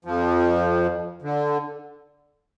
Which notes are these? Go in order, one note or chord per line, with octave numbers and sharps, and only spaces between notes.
F2 F3
D3